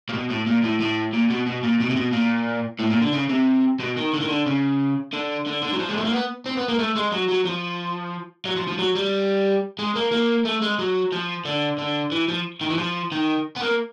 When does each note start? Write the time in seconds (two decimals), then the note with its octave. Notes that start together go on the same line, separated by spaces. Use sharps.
0.09 A#2
0.14 B2
0.30 A2
0.47 A#2
0.63 A2
0.80 A2
1.13 A#2
1.30 B2
1.46 B2
1.63 A#2
1.80 B2
1.90 C3
1.96 B2
2.13 A#2
2.80 A2
2.91 A#2
3.02 D3
3.13 C#3
3.30 C3
3.80 B2
3.96 D#3
4.13 D3
4.20 D#3
4.28 D3
4.46 C#3
5.13 D3
5.46 D3
5.62 D3
5.73 F#3
5.79 F3
5.89 G#3
5.97 A3
6.05 A#3
6.12 B3
6.46 C4
6.57 B3
6.68 A#3
6.79 A3
6.96 G#3
7.12 F#3
7.29 F#3
7.46 F3
8.46 F#3
8.56 F3
8.68 F3
8.79 F#3
8.95 G3
9.79 G#3
9.96 A#3
10.12 A#3
10.45 A3
10.62 G#3
10.79 F#3
11.12 F3
11.45 D3
11.78 D3
12.12 E3
12.28 F3
12.61 D#3
12.70 E3
12.78 F3
13.12 D#3
13.56 B3
13.62 A#3